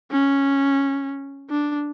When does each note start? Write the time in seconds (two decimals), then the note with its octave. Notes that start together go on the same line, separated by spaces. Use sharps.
0.11 C#4
1.50 D4